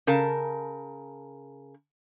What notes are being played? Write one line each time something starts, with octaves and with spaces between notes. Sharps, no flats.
C#3 A#4 A5